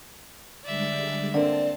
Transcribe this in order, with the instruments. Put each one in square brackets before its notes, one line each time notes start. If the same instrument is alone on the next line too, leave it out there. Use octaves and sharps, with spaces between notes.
[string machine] D3 G3 G#3 [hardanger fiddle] D5 E5
[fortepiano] D3 A#3 [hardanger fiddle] C4 [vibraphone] D5 [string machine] A5